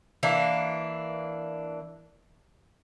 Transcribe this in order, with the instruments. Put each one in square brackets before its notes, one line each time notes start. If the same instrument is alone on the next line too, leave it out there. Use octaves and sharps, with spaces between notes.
[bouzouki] E3 A#3 D4